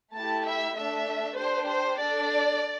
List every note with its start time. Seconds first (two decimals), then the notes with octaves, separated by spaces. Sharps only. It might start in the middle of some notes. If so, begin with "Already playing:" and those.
0.15 A3 E4 G4 A5
0.46 E5
0.76 A3 D4 A4 E5
1.37 D4 G4 C5
1.67 C5
1.98 D4 A4 D5